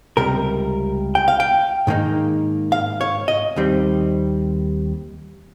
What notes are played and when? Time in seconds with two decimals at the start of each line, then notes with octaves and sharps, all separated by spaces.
0.17 C#2 C3 G3 A#4
1.15 G5
1.28 F5
1.40 G5
1.87 G#2 D#3 A#3 D#4
2.72 F5
3.01 C#5
3.28 D#5
3.56 D#2 D#3 G3 C4